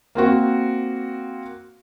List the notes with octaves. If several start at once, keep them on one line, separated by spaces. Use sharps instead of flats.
A#3 C4 F#4